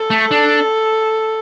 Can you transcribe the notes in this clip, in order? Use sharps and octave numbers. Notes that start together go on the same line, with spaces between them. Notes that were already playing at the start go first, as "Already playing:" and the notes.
Already playing: A4
A3
D4